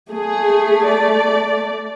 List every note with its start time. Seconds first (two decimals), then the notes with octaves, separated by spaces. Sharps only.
0.12 A3 G#4
0.89 D5